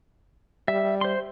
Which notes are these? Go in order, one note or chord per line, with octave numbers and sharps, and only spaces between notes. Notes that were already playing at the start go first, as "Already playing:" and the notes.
G3 E5
C5 C6